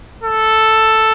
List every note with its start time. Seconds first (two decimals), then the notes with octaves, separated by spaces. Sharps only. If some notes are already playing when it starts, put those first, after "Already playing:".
0.23 A4